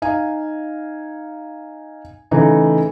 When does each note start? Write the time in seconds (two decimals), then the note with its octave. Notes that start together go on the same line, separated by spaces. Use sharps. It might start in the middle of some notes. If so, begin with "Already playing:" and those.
0.02 D#4 F5 G#5
2.31 C#3 E3 A3 D#4